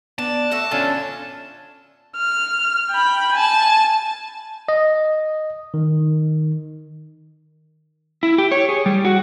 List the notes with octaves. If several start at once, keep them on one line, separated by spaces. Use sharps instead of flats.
B3 D4 A5
A3 F#4 D5 E5
C#4 D4 F4 A4 G#5
F6
G5 B5
G#5 A5
D#5
D#3
E4
G4
C#5
G#4
G3
F#4